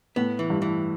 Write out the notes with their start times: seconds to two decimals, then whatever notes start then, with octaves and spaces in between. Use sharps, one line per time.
0.16 A2 B3
0.39 E3
0.50 G2
0.62 E3